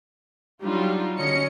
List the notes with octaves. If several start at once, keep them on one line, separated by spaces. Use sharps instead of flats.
F#3 G3 D4 D#4 F4
D3 F#3 C#4 D#5 C#7